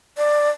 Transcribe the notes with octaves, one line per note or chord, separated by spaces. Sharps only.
D5